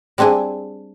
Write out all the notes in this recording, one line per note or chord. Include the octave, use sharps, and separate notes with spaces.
G3 C4 D4 E4 G#4